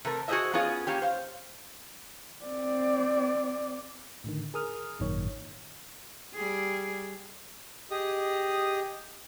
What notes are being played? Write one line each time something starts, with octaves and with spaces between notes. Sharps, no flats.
C3 A3 A#4
F#4 G#4 B4 C5 D#5 E5
B3 C#4 F4 G#4
A#3 C#4 G4
C5 F5
C4 D5
A2 D3 D#3
G#4 A#4 D#6 F6
G#1 F#2 A#2 D#3 C#5
G3 G#4
G4 G#4 D#5 D#6